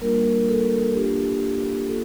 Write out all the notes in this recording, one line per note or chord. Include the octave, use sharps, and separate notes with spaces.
G3 A#3 D4 F4 A#4
A4
A#3 D4 F4 G4
A#3 F4 A4